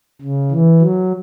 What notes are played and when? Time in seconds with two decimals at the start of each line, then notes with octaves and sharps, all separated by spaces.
0.21 C#3
0.51 E3
0.81 F#3